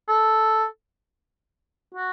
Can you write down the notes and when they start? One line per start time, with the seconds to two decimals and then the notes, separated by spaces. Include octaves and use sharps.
0.08 A4
1.95 F#4